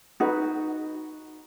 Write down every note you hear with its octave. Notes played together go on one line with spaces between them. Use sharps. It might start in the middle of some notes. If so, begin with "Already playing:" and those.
D#4 F#4 B4